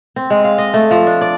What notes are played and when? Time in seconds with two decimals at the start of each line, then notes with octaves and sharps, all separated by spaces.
0.16 C4
0.30 G#3
0.44 F5
0.58 D#5
0.74 A3
0.91 F3
1.07 D4
1.21 D5